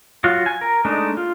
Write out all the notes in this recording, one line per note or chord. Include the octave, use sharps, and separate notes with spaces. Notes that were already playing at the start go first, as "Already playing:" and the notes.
F#3 F4 F#4
G#5
A#4
G#3 A3 D4 D#4
F4